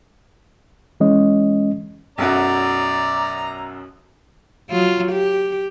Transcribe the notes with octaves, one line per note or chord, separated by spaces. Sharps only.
E3 G#3 C#4 D#5
B1 F#2 F#4 D5 A#5
F#3 F4
G4